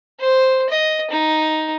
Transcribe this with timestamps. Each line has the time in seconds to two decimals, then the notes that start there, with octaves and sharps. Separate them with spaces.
0.20 C5
0.70 D#5
1.11 D#4